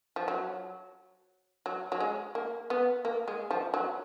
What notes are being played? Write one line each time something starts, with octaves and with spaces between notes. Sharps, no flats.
F3
F#3
F#3
F#3
G#3
A#3
B3
A#3
G#3
F3
F#3